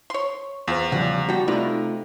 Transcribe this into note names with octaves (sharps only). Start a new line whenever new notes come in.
C#5 C6
E2 F4 C5
C#3 F3 G3 F#5
G3 F#4 A4 G5
C3 A3 D#4 F4 B4 D5